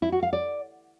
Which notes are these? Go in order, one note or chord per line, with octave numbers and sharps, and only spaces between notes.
E4
F#4
F5
D5